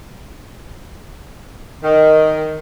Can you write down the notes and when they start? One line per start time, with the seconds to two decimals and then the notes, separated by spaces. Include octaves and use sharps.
1.83 D#3